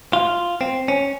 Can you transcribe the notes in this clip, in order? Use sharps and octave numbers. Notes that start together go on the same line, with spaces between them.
F4
C4
C#4